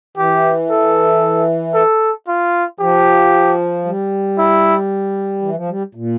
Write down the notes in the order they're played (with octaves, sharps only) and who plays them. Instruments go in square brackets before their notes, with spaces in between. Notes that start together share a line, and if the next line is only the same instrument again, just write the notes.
[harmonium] E3 [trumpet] G4
[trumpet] A4
A4
F4
[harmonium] F3 [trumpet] G4
[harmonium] G3
[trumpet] E4
[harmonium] E3
F3
G3
A#2